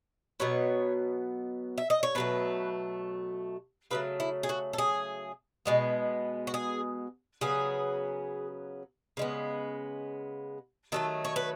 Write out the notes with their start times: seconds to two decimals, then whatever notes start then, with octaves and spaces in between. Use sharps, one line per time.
0.40 B2 F#3 B3 C#5
1.78 E5
1.90 D#5
2.03 C#5
2.15 B2 F#3 A3 B4
3.91 C#3 F#3 A3 B4
4.20 E4
4.43 G#4
4.49 F#4
4.73 A4
4.78 G#4
5.66 B2 G#3 B3
6.47 F#4
6.54 G#4
7.41 C#3 F#3 B3 G#4
9.17 C#3 G#3 B3
10.92 D#3 F#3 A3 A4
11.25 C#5
11.36 B4